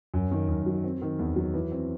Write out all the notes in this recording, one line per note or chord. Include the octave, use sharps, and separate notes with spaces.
F#2
D#3
F#2
F#3
C4
D#3
E2
F#3
E3
C4